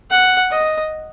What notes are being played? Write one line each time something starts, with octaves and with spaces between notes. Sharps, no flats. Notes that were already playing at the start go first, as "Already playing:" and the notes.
F#5
D#5